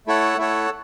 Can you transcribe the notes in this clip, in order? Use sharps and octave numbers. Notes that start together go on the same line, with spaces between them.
A3 E4 A4 C#5 F#5
A3 E4 A4 C#5 F#5